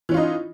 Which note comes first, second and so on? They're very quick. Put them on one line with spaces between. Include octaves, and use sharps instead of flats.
E3 C#4 F4 D#4